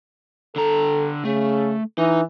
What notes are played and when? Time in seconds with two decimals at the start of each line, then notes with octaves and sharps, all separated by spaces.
0.56 D3 A4 A#5
1.25 C#3 A3
1.98 E3 D#4